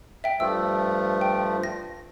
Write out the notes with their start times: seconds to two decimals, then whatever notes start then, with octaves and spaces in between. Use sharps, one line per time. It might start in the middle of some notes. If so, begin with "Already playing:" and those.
0.24 E5 G5
0.40 G2 F3 A3 E6
1.21 G5
1.63 A#6